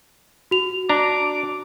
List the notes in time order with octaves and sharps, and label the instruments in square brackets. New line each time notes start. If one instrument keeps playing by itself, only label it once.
[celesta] F#4 F7
[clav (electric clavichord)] D4 A#5 [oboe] D6